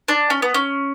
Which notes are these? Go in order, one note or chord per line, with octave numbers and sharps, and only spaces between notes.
D4
C#4
B3
C#4